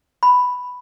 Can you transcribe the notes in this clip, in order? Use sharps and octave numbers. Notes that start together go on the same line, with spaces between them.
B5